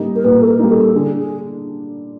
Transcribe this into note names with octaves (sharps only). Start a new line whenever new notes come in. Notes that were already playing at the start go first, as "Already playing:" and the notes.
Already playing: G3 A#3 D#4
A#4
A#2 B4
A4
A#4
G3 A#3 D#4
A4
D3 G#4
G#4